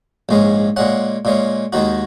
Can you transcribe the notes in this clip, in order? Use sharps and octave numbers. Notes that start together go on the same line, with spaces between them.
A#1 G#2 G#3 C#4
A#2 G#3 C#4 F#5
A#2 G#3 C#4
D#2 D#3 G#3 F#4